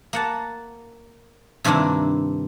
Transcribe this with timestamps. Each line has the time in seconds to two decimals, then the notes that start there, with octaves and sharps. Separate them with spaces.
0.13 A#3 F#5 A5
1.64 G2 C3 D#3 A#3 D4 E4